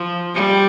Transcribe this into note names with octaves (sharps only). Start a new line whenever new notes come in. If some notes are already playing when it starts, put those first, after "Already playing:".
Already playing: F3
G3